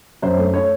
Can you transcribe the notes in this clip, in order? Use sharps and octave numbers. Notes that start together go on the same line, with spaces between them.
F#2 C5
A3
C#5